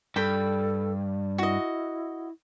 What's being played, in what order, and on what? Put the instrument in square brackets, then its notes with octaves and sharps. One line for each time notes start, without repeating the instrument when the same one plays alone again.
[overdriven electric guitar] G2 [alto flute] A4 [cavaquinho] G5 B5
[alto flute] E4 [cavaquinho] F#4 D#5